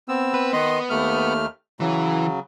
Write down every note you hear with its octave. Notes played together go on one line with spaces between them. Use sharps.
B3 C4 E6
B4
D#3 B3 D#5 C6
D#2 A3 F6
C#3 E3 F#3